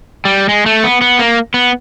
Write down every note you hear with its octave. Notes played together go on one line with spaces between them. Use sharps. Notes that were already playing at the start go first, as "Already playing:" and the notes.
G3
G#3
A3
B3
B3
A#3
B3